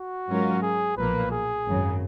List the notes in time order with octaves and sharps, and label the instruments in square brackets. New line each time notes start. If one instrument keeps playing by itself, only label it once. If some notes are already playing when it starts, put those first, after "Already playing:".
Already playing: [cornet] F#4
[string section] G#2 F#3 C#4 F4 A#4
[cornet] G#4
[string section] B1 A#2 F3 A#3 [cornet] B4
[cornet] G#4
[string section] G#1 F#2 C#3 F#3